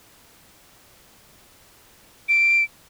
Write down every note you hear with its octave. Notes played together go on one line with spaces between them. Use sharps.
D7